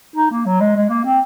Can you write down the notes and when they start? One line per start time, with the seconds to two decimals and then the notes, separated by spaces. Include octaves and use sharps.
0.16 D#4
0.31 A#3
0.46 F#3
0.61 G#3
0.76 G#3
0.89 A#3
1.05 C4